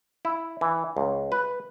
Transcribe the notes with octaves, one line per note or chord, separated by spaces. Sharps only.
E4
E3
C#2
B4